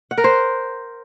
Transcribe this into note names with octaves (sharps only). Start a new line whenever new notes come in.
F#5
A#4
C5